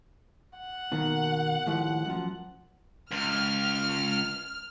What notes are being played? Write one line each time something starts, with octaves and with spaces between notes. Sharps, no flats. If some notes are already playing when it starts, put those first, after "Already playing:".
F#5
B2 D#3 A#3
D#2 A2 F3
F#2 F3
C#2 F6